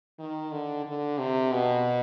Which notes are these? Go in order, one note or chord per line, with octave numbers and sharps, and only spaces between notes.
D#3
D3
D3
C3
B2